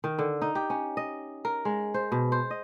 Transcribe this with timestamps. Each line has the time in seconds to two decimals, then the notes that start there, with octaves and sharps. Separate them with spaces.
0.04 D#3
0.19 D3
0.42 D#4
0.55 G4
0.70 C#4
0.97 D#5
1.45 A#4
1.65 G#3
1.94 C5
2.12 B2
2.32 C5
2.50 D#5